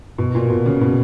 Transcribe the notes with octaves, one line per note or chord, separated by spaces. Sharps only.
B2
A#2
B2
C#3
B2